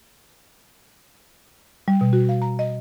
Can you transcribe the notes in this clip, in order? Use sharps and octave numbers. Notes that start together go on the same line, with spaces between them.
G3
B2
F#4
F5
A#5
D#5